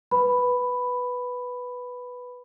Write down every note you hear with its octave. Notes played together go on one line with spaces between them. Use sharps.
B4 B5